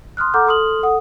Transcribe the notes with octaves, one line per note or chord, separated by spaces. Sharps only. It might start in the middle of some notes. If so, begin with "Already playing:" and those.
C6 D#6 F6 F#6
A4 F#5 A#5 D6 F6 G6
A4 C6 D#6 F6 F#7
A4 F#5 D#6